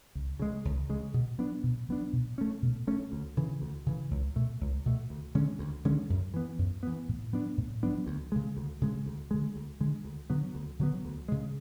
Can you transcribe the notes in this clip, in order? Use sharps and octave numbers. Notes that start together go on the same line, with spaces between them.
C#2
C#3 G#3
C#2
C#3 G#3
B2
F#3 B3 D4
B2
F#3 B3 D4
B2
A3 C#4
B2
A3 C#4
D2
C#3 E3
D2
C#3 E3
C#2
B2 A3
C#2
B2 A3
D2
D3 G#3 C#4
D2
D3 G#3 C#4
F#2
E3 B3
F#2
E3 B3
A2
F#3 B3 D4
A2
F#3 B3 D4
D2
C#3 G#3
D2
C#3 G#3
D2
D3 G#3
D2
D3 G#3
D2
D3 F#3 B3
D2
D3 F#3 B3
D2
C#3 G#3